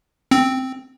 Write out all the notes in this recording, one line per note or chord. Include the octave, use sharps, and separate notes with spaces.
C4